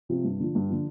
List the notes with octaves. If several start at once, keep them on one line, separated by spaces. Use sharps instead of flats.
C3 F3 C4
G2
D3 F3
G2
D3 F3